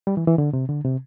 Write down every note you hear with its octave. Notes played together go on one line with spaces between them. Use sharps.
G3
E3
E3
D3
C3
D3
C3